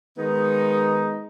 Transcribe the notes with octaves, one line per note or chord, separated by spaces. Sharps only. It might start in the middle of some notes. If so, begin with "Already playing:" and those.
D#3 G#3 B3 D#4